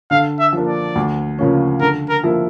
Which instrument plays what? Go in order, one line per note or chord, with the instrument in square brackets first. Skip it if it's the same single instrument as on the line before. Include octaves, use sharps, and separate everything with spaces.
[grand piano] D3 [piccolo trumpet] F5
[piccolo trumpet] E5
[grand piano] F3 A#3 D4
[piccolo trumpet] D5
[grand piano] D2
C#3 F3 A#3 C#4
[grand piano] D3 [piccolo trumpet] A#4
[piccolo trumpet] A#4
[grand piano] F3 A#3 E4